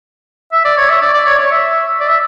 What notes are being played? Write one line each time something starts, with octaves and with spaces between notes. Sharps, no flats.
E5
D5
C#5
E5
D5
D5
C#5
C#5
E5
D5
E5